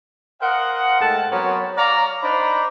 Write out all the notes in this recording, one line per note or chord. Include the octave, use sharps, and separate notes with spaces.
A#4 C5 D#5 F5 F#5
G#2 A3 F#5 G5 A5
F#3 B3 C4 A#4 C5 C#5
C#5 D5 F5 A#5
D4 D#4 C5 D5 A#5 B5